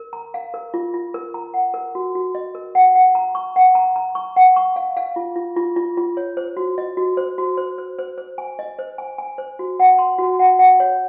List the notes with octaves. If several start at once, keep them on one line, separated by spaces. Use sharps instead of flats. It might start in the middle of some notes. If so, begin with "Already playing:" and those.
Already playing: A#4
A#5
F5
A#4
F4
F4
A#4
A#5
F#5
A#4
F#4
F#4
D#5
A#4
F#5
F#5
A#5
C#6
F#5
A#5
A#5
C#6
F#5
C#6
F5
F5
F4
F4
F4
F4
F4
C#5
C5
F#4
D#5
F#4
C5
F#4
C5
C5
C5
C5
G#5
D#5
C5
G#5
G#5
C5
F#4
F#5
C6
F#4
F#5
F#5
C#5